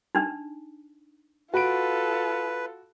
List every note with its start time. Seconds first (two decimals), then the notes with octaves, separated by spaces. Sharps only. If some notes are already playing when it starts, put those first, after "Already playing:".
0.15 D4 D#4
1.54 F4 F#4 A4 B4 B5 D7